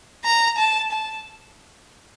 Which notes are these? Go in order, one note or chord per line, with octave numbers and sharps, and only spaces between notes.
A#5
A5
A5